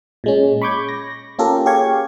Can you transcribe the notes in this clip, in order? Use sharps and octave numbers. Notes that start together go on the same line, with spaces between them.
A#2 G#3 C#4
B5 C#6 D6 G6 G#6
A#6
A#3 C#4 F4 G4 A4 A#4
G4 G#4 C#5 F5 C#6 G#6